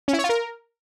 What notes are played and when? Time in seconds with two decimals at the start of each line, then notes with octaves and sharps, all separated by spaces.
0.08 C#4
0.13 E4
0.19 C#5
0.24 F4
0.29 A#4